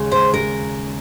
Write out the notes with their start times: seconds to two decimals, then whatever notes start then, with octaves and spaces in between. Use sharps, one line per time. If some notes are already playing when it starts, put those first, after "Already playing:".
Already playing: D#2 C#3 G#3
0.12 C5
0.34 A#4